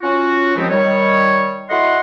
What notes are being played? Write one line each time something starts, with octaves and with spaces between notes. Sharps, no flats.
C#4 F4 F#4
D#2 D#3 F3 G#3 B3 C4
D#3 G3 C#5
E4 F#4 A4 D#5 F#5 C6